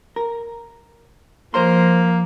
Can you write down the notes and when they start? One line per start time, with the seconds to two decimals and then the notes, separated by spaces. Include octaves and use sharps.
0.16 A#4
1.54 F3 A#3 A#4 C5 C6